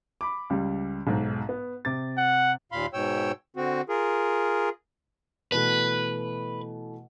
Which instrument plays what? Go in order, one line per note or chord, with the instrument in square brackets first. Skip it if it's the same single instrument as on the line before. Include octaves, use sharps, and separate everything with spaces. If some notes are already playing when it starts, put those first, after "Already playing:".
[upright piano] B5 D6
C#2 G3
B1 G#2
B3
C3 D6 A6
[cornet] F#5
[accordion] D#2 A#2 F5 B5 C6
G#2 B2 C#5 G5 E6
D3 C4 F#4
F4 G#4 A#4
[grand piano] B2 E3 A3 [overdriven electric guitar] B4